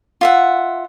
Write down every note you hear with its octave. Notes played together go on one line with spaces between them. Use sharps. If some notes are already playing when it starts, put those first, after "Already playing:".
F4 E5 F#5